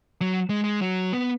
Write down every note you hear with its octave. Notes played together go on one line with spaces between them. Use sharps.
F#3
G#3
G#3
F#3
B3